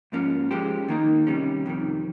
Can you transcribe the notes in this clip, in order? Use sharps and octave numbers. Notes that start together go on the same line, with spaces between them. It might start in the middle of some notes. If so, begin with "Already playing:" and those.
G#2 F3 A#3 C#4
F3 G#3 C#4 G4 C5
D#3 A#3 D#4
C3 D#3 G3 C#4
F2 C3 D#3